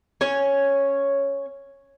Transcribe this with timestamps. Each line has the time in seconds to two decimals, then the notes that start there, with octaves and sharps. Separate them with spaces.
0.21 C#4 C#5